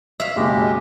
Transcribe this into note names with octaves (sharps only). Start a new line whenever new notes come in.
E5 F5
F#1 B1 G#3 G4